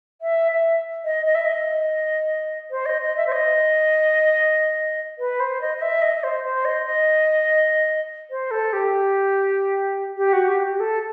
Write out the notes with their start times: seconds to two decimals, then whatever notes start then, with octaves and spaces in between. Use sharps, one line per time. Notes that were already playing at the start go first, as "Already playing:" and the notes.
0.21 E5
0.52 E5
1.05 D#5
1.26 D#5
1.35 E5
1.46 D#5
2.71 C5
2.86 D#5
3.01 D#5
3.17 E5
3.27 C5
3.32 D#5
5.19 B4
5.40 C5
5.61 D#5
5.77 D#5
5.82 E5
6.02 D#5
6.16 D#5
6.23 C5
6.44 C5
6.65 D#5
6.86 D#5
8.31 C5
8.51 A4
8.73 G4
10.17 G4
10.33 F#4
10.48 G4
10.74 G4
10.80 A4